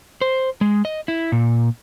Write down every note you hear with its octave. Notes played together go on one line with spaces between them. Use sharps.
C5
G#3
D#5
E4
A#2